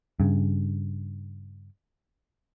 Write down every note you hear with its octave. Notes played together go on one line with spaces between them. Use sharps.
G2 C#3